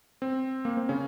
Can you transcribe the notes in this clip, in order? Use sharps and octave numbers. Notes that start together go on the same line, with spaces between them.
C4
A#3
C4
C#3 C#4